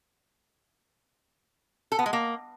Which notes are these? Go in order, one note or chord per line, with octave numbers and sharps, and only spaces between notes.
A4
B3
G#3
A#3